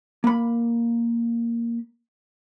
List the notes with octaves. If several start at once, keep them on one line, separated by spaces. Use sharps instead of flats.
A#3 B5